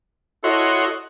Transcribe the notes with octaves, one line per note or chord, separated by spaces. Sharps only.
E4 F#4 A4 C#5 D#5 C6